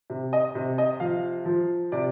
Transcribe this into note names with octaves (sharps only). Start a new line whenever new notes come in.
C3
D#5
C3
D#5
F3 F5
F3
C3 D5